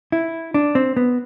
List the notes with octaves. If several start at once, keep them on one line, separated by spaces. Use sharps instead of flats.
E4
D4
C4
B3